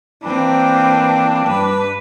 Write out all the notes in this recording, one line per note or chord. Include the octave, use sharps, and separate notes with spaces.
E3 A#3 C4 D4 G5
G2 B4